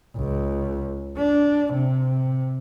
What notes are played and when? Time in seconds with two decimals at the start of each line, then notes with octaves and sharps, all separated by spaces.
0.16 C#2
1.17 D4
1.74 C3